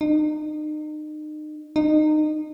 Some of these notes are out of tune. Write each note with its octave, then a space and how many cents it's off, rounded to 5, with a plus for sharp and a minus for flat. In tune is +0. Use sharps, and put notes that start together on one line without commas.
D#4 -35
D#4 -25